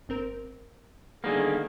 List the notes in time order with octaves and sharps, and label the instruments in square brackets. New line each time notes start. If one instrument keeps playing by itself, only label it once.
[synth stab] G1 C4 A#4
[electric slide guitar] D3 G3 B3 [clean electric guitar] D#3 A#3 [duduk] G#4